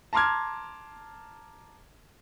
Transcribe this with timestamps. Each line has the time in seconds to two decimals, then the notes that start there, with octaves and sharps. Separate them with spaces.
0.13 A5 A#5 C6 D6 F6 G#6